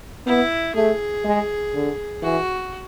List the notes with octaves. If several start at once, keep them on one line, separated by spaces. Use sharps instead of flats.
B3 E4
A3 G#4
G#3
D3
E3 F#4